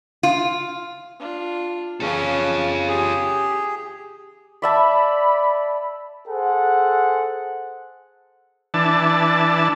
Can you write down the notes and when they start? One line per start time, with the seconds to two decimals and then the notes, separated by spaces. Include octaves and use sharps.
0.23 F4
1.19 D4 F4
2.00 C#3 C#4 F4 A4 G#5
2.88 G4 G#4
4.62 D5 E5 A5 B5
6.28 G#4 A4 C5 F#5
8.74 E3 D4 A5